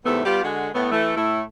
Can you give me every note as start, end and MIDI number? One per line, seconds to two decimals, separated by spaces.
0.05 0.24 40
0.05 0.24 44
0.05 0.24 48
0.05 0.24 57
0.05 0.24 59
0.05 0.24 76
0.25 0.40 55
0.25 0.40 59
0.25 0.40 65
0.25 0.40 67
0.44 0.68 50
0.44 0.68 56
0.44 0.68 66
0.74 0.88 45
0.74 0.88 57
0.74 0.88 59
0.92 1.14 52
0.92 1.14 57
1.16 1.42 45
1.16 1.42 57
1.16 1.42 64